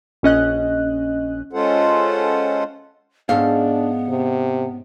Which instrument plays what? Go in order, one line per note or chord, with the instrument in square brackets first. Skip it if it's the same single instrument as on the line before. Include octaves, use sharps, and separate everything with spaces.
[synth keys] A#1 C#4 D#5 F#6
[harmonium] G#3 C#4 F4 A4 C5 F#5
[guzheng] G#2 C#4 A4 [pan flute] B3 [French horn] D4 [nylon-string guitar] F5
[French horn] C3